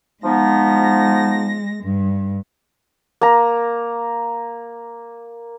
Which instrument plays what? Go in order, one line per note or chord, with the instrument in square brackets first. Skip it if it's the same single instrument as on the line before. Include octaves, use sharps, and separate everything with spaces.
[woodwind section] F3 B3 D#4 [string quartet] G#3 A#6
[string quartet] G2
[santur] A#3 A#5